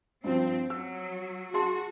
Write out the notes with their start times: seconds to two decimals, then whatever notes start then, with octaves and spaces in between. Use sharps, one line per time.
0.24 G2 F3 C4
0.70 F#3 E6
1.54 F#4 G#4 A5 C6